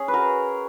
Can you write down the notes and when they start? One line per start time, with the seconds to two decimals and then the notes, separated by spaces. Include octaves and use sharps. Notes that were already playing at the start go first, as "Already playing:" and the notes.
Already playing: C#4 G#4
0.08 B4
0.14 F#4 A#4